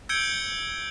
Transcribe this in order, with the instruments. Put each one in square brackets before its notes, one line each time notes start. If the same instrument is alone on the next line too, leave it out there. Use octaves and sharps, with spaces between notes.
[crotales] E6 G6 G#6 C#7 D7 G7